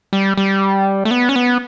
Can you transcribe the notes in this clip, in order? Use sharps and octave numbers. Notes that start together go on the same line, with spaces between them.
G3
G3
A3
B3
C#4
B3